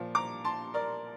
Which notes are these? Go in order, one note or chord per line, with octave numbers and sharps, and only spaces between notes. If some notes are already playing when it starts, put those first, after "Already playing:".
Already playing: A#2 F3
A#5 D6
A5 C6
A#4 D5